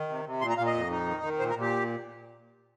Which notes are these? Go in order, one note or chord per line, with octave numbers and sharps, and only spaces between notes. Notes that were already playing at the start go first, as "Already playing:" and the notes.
Already playing: D#3
C3
C3
A#2 C6
A#5
A#2 F5
D#5
F2
D#4
D#3
D#3
A#2 C5
A#4
A#2
G4